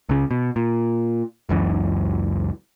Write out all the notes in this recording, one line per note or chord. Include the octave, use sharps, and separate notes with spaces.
C#2 C#3
B2
A#2
F#1 C#2 F#2 E3